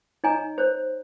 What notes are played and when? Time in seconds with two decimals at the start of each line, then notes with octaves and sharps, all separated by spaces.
0.24 D#4 C#5 D#5 G#5 A#5
0.58 C5 C#5